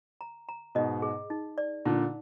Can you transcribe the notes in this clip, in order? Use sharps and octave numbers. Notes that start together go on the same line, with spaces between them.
A#5
A#5
G#2 B2 D#5
G#4
D#4
D5
A#2 D3 D#4